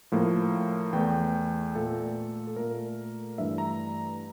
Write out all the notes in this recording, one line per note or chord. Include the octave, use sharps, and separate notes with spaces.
A2 F3 A#3
E2 E3 A3 G5
A#2 A3 A4
A4
A#2 A3 A#4
G2 E3 A3 E5
A#5